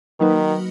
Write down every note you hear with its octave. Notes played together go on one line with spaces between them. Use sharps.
D#3 F#3 A#3 D#4 F#4 B4